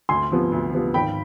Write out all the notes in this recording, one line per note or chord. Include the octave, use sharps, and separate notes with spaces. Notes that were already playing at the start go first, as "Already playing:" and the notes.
D2 G#5 C6
C3 F3 B3
D2
C3 F3 B3
G#1 G5 B5